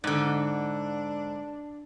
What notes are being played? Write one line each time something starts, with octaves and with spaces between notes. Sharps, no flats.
G#2 D3 D4